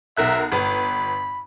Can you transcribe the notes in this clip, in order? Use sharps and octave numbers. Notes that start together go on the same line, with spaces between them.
B1 A#4 E5 F#6
G1 B4 B5